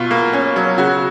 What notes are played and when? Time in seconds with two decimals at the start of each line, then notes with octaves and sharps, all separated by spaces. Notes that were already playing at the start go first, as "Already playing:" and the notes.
Already playing: B2 F4
0.11 A#3
0.33 C#4
0.56 F#3
0.78 C#3 F#4